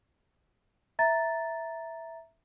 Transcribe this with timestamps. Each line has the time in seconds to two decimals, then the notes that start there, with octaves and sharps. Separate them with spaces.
0.99 E5 A#5 A6